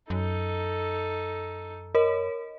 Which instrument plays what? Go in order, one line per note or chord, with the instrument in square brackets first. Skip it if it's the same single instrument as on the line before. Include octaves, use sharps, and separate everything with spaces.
[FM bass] F#2 [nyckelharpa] D#4 A4
[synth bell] A#4 C#5 D#5